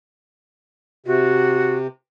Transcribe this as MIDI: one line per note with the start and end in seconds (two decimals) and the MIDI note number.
1.06 1.87 48
1.06 1.75 66